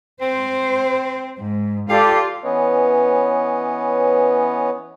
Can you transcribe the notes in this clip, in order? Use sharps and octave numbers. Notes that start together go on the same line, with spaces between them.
C4 C5
G#2
F4 G4 A4 D5 F5
E3 B3 C#4 B4 C#5 D#5